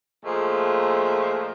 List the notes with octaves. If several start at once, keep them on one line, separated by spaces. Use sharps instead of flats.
A#2 F3 G#3 A3